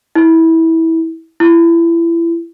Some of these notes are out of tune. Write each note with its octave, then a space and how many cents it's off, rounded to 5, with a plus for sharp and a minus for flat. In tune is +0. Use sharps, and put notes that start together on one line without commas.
E4 -20
E4 +30